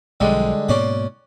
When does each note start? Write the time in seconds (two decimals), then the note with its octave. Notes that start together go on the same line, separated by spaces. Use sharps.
0.20 B1 D3 F3 G3 G#3
0.69 G#2 B2 A#3 C#4 D5 F#5